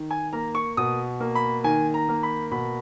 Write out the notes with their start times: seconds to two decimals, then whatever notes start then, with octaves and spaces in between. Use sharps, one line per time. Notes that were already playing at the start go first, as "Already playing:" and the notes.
Already playing: D#3
0.11 G#5
0.33 A#3 A#5
0.55 C#6
0.77 B2 D#6
1.20 A#3
1.35 B5
1.64 D#3 G#5
1.94 A#5
2.09 A#3
2.23 B5
2.51 B2 B5